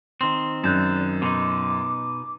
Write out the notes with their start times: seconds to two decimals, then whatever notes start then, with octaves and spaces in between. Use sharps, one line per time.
0.21 D#3 C4 C6
0.64 F#2 D5 F#6 G6 E7
1.22 B2 D#4 C6 D6